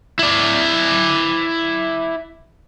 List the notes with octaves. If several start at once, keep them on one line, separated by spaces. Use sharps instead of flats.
E4 D5